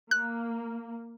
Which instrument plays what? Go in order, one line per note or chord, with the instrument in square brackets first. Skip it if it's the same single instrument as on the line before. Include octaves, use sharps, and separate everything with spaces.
[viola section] A#3 [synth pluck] F#6